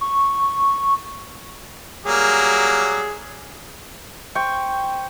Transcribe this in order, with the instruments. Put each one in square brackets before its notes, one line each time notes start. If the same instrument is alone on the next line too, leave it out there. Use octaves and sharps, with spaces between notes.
[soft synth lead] C#6
[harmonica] F#3 G3 A#3 [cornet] G#4
[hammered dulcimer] C5 G5 C#6